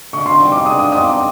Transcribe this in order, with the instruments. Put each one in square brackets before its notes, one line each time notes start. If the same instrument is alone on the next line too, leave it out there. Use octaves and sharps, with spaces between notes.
[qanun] D3 [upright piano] C#6
[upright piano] C6
[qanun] G3 C4 D#4
[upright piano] D6
[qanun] G#3 [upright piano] D#6
[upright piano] D#6
[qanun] C4 D#4 [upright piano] D#6
[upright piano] D6